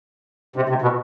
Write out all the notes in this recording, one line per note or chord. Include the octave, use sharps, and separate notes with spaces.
C3
C3
B2